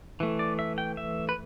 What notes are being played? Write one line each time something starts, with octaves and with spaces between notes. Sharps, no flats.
E3 A3
D5
E5
G5
E5
B4